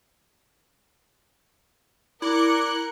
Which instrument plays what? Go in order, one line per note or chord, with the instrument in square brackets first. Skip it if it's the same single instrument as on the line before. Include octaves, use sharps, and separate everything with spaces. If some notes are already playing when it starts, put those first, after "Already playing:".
[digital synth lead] E4 [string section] A#4 F#6 C#7 [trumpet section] D5 D6